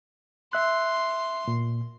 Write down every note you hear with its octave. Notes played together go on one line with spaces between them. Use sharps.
E5 C6 F#6
A#2